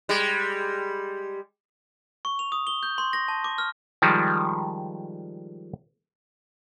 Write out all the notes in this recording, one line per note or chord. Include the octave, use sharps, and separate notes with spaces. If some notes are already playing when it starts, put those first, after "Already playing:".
G3 G#3
C#6
F7
D#6
G7
G6
C6
A#6
A5
D6
F6
D#3 F3 G3 G#3